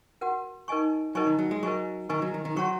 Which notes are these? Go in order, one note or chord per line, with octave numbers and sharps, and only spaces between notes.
F#4 A#4 F#5
D#4 A#4 D#5 G#5 C#6
F#3 D#4 A#4 D#5 G#5 C#6
D#3
F#3
G#3
F#3 A#4 D#5 G#5 C#6
D#3 A#4 D#5 G#5 C#6
F#3
D#3
D#3
F#3 F#4 C#5 F#5 A#5 C#6